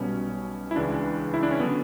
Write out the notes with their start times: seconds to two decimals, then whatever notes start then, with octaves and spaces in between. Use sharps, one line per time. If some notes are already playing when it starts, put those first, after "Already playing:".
Already playing: B1 B2 G3 C#4
0.71 E4
0.76 C#2 C#3 E3 D4
1.34 E4
1.43 D4
1.51 C#4
1.60 D3 F#3 B3